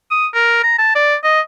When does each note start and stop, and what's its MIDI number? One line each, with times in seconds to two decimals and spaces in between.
0.11 0.27 87
0.34 0.60 70
0.63 0.77 82
0.78 0.92 81
0.95 1.15 74
1.24 1.41 75